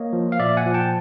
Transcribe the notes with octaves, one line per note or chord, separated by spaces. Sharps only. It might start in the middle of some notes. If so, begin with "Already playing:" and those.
Already playing: A#3 C#5 D#5
F3
F5
A#2 D5 E5
F#5 G#5
F3
G5 A5